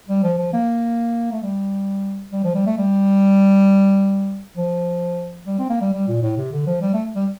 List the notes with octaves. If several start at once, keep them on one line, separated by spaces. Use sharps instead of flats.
G3
F3
F3
A#3
A3
G3
G3
F3
G3
A3
G3
F3
G3
C4
A#3
G3
G3
A#2
A2
C3
D3
F3
G3
A3
G3